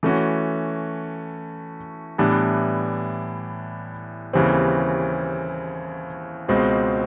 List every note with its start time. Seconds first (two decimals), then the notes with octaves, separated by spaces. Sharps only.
0.03 E3 A3 C#4 F#4
2.18 A2 E3 G3 B3 D4
4.33 D#2 C#3 E3 G3 C4
6.48 C#2 B2 G#3 C4